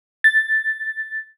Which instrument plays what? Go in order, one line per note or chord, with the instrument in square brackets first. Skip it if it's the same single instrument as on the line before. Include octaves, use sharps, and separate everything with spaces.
[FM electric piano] A6